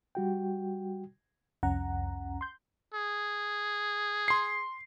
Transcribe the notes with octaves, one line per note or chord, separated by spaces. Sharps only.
G3 F#4 G5
C2 F2 C#4 F#5 A#5
C6 G6
G#4
C6 C7